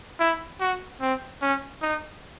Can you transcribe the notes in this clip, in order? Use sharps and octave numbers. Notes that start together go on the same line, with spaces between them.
E4
F#4
C4
C#4
D#4